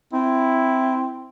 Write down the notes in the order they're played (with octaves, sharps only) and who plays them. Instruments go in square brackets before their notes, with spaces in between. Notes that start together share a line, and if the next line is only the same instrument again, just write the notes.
[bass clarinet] C4 [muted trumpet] E4